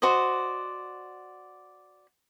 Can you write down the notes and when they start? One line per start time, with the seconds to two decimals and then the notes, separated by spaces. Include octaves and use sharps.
0.02 F#4 C5 D5 D#5